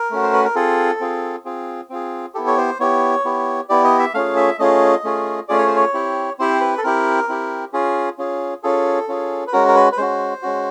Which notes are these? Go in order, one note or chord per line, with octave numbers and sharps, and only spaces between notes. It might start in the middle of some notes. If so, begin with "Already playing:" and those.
Already playing: A#4
A3 C#4 F#4
C5
B4
A#4
C4 F4 G#4 A4
C4 F4 G#4
C4 F4 G#4
C4 F4 G#4
B3 E4 G4 A4
C#5
C5
B3 E4 G4 C#5
B3 E4 G4
B3 E4 G4 D5
D#5
E5
A3 C#4 F4 G#4 F5
E5
A3 C#4 F4 G#4 D#5
A3 C#4 F4 G#4
A3 C#4 F4 G#4 D5
C#5
C5
C#5
C4 E4 G4
C4 E4 G4 C5
B4
A4
C4 E4 G4 A#4
C4 E4 G4
C#4 F4 G#4
C#4 F4 G#4
C#4 F4 G#4 A4
C#4 F4 G#4
B4
G#3 C#4 F#4 A#4
A#4
B4
B4
G#3 C#4 F#4 C5
G#3 C#4 F#4